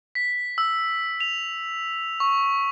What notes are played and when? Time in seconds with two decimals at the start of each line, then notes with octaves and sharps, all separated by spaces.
0.15 B6
0.58 E6
1.20 F7
2.20 C#6